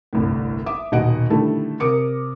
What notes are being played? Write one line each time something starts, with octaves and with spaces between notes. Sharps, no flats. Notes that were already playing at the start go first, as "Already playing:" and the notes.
G1 C2 A2
E5 D6 D#6
D#1 B2 D#4 D#5 F#5 D7
D3 D#3 G3 A3 E4 A4
C3 A#4 D6 D#6 C#7 D7